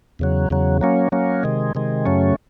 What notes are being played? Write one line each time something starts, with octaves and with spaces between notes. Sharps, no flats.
E2 C#3 F#3
E2 C#3 F#3
F#3 A#3 C#4
F#3 A#3 C#4
C3 D#3 G#3
C3 D#3 G#3
F#2 C#3 F#3 A3 C#4